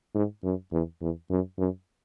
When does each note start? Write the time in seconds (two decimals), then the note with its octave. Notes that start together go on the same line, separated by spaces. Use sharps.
0.15 G#2
0.44 F#2
0.72 E2
1.02 E2
1.31 F#2
1.59 F#2